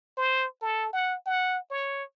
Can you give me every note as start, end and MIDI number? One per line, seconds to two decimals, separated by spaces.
0.17 0.46 72
0.62 0.89 69
0.93 1.15 78
1.26 1.58 78
1.71 2.04 73